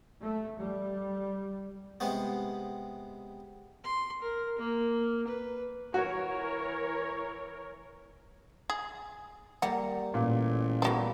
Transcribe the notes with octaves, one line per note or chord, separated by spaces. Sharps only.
A3
G3
C3 G#3 B3
C6
A#4
A#3
B4
E3 F#4 A#4 C#5
G#4
G3 A#3 F#5
A1 A#2
F3 G3 A#3 B3 F#4